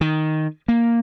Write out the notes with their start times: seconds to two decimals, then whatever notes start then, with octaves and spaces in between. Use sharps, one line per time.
0.01 D#3
0.68 A#3